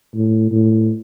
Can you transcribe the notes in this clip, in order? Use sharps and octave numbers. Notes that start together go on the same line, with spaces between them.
A2
A2